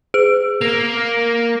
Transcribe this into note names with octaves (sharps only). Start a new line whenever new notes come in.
G#4 D7
A#3 F7